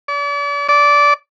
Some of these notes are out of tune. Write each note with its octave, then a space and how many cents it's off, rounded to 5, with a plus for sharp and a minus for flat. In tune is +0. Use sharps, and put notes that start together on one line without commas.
D5 -40
D5 -15